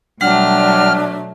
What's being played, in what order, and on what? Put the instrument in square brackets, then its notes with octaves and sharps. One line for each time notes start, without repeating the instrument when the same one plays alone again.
[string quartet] B2 F#3 A3 [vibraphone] G3 F#5 [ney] D4 [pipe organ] F6